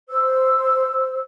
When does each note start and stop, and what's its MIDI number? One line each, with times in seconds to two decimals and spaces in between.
0.10 1.20 72
0.10 1.20 88